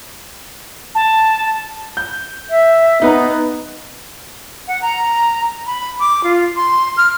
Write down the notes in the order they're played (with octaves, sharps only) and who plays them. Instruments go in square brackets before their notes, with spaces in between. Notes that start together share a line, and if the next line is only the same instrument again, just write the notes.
[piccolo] A5
[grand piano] G6
[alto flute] E5
[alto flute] B3 [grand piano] D#4 B4 A#5
[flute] F#5
A#5
B5
D6
F4
C6
F6